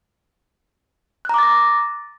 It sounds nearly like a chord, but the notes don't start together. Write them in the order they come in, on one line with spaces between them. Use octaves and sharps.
F#6 A#5 D6 A6 A#6